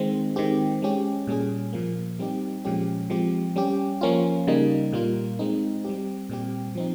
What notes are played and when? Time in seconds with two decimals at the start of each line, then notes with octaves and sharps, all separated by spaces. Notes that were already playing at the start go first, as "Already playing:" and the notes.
Already playing: D#3 G#3 C4
0.36 D#3 G#3 C4 G4
0.82 G#3 C#4 G4
1.27 A#2 G3 C#4 G#4
1.73 A#2 F3 A#3
2.19 G3 C4 D#4 G4
2.64 A#2 F3 G#3 C#4 G4
3.10 F3 G#3 C4 G4
3.56 G3 C#4 G4
4.01 F3 A#3 C#4 F4
4.47 C#3 G3 A#3 D#4
4.92 A#2 G3 A#3 F4
5.39 G#3 C4 D#4
5.84 G3 C4 G4
6.29 A#2 G3 C4 G4
6.75 F3 C4 D#4